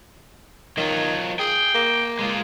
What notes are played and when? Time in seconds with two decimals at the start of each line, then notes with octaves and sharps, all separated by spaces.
0.78 D#3 F#3 F4
1.39 G#4 G5
1.74 A#3
2.19 G#3 F4